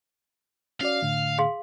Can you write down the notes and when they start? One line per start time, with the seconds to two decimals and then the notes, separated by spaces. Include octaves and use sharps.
0.81 C#4 F#4 D5 F5
1.02 A2 D3
1.38 G#4 F5 C6